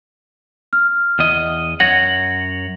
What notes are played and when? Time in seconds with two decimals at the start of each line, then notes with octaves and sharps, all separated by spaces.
0.73 F6
1.19 E2 D#5
1.80 F#2 C#5 F#5 A#6